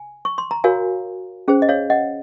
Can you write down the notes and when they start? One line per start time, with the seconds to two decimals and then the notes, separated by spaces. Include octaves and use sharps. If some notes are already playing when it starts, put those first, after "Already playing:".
Already playing: G#5
0.25 C#6
0.38 C6
0.51 A#5
0.64 F#4 A#4 C#5 F5 G#5
1.48 C#4 G#4 C5
1.62 D#5
1.69 C#5 F5
1.90 D#5 F#5